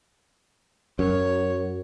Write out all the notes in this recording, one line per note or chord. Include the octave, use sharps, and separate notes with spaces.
F#2 C#5